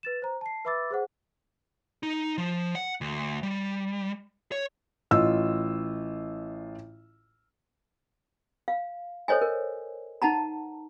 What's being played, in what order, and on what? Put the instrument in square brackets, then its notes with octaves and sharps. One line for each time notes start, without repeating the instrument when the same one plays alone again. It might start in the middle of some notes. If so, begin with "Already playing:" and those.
[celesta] B4 A6 E7
C5 A#5
A5 C7
B4 E5 B5 D6 E6 A6
G#4 C5 F#5
[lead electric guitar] D#4
F3
F#5
D2
G3
C#5
[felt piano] A1 F4 D#5 E6
[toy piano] F5
A4 C5 C#5 D#5 G#5
A#4
D#4 F#5 A5 A#5